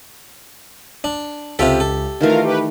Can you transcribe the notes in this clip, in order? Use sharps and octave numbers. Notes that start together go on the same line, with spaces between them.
D4
C#2 C3 F4 G4 A4 E5 D6
A4
D#3 E3 A3 F4 A#4 F5
G4 B4